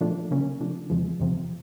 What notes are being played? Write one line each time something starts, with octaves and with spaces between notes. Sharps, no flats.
A#2 F3 A3 D4
C#3 F#3 A#3 C#4
C3 F3 A3 D4
E2 C3 F3 G#3
F2 C3 F3